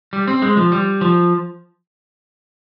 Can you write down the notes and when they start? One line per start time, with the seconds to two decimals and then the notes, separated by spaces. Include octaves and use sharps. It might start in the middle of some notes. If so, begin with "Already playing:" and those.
0.13 G3
0.28 C4
0.42 G#3
0.57 F3
0.72 G3
1.01 F3